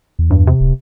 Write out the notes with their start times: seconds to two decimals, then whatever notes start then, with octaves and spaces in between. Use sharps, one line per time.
0.19 E2
0.30 G2
0.47 C3
0.60 D1